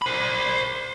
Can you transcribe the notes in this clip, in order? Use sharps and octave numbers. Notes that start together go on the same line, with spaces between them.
C5 B5